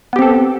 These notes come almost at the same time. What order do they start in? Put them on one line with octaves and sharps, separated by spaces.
B3 G4 C4 A4